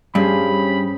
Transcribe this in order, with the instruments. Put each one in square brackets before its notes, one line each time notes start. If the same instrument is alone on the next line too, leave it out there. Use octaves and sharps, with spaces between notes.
[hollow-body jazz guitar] G2 [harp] G3 G#4 C5 [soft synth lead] C#4 [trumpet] B5